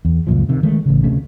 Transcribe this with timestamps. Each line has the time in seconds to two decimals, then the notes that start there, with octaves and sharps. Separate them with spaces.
0.05 E2
0.27 C#2 F#2 A#2 F3
0.49 C3 D#3
0.63 D#3 G#3 A3
0.86 A1 C#3
1.03 D2 C3 A3 C#4